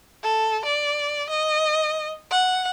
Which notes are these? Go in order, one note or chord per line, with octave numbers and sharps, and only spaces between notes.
A4
D5
D#5
F#5